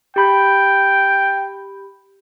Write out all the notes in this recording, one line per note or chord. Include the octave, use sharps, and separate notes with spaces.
G4 G5 B5 G6